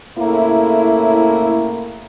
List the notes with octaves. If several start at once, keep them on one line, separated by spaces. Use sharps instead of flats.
A2 C#3 A3 A#3 E4